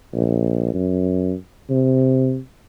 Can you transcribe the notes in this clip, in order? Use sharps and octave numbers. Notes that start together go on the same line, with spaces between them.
A#1
F#2
C3